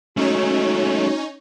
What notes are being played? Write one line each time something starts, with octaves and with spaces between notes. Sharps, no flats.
G#3 A3 C#4 D#4 F#4 C#5